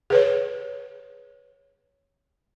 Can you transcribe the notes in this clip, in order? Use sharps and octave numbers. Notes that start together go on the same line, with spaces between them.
G#4 B4 C#5